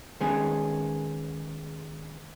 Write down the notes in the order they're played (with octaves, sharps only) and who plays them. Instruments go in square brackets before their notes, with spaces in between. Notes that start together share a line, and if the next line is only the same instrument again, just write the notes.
[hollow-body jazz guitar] D#3 G#3 B3 C#4 G#4